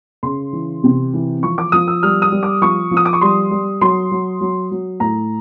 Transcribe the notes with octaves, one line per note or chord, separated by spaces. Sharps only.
C#3 C6
E3
C3
E3
F3 C#6
D6
F3 D#6
E6
G3 F6
D#6
G3
D6
F3 C#6
F3
D#6
D6
C#6
G3 C6
G3
F#3 C6
F#3
F#3
F#3
A2 A#5